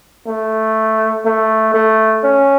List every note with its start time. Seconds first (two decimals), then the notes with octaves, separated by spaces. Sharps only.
0.27 A3
1.26 A3
1.74 A3
2.24 C#4